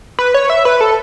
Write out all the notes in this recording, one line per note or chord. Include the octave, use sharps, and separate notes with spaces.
B4
C#5
E5
B4
A4